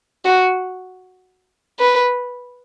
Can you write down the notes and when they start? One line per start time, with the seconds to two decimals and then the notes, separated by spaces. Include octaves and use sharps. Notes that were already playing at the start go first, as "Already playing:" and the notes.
0.25 F#4
1.80 B4